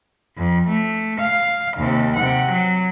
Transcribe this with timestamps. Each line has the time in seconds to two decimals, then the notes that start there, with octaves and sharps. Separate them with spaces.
0.38 F2
0.69 A3
1.20 F5
1.77 D#2 C3
2.16 C3 F#5
2.51 F#3